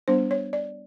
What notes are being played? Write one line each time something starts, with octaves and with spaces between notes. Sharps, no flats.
G3 B3 D4 C5
C#5
D5